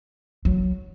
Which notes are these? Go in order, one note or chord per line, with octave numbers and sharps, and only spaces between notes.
F#3